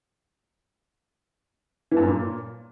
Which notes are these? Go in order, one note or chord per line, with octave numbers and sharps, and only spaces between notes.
E3
G2
F#2
A#2